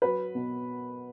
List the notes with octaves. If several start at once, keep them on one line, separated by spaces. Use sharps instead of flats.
F#3 B4
B2